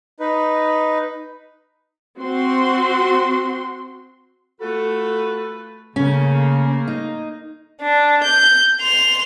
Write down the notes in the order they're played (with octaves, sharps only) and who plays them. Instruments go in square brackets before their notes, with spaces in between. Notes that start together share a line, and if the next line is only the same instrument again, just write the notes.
[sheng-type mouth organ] D#4 B4
[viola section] C4 F#4 C6
[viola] A3 B4 [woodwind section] F4 F#4 A4
[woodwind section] C#3 [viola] A3 A#3 [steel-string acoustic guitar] C#4
[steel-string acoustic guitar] D#4
[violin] D4
G6
C6 F7